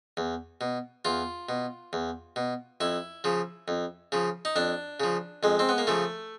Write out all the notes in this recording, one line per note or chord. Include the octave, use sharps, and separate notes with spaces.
E2
B2
E2 F4
B2
E2
B2
F2 E4
C#3 F3
F2
C#3 F3
D#4
F2 D4
C#3 F3
F2 G#3
C4
B3
A#3
C#3 F3 A3